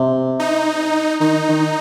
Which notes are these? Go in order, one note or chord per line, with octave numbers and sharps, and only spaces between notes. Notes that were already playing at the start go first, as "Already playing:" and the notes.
Already playing: C3
D#4
D#3 D#4
D#3